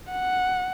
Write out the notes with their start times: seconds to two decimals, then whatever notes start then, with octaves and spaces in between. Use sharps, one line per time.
0.12 F#5